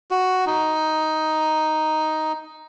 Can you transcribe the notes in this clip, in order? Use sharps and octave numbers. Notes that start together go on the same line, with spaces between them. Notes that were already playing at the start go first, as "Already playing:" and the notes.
F#4
D#4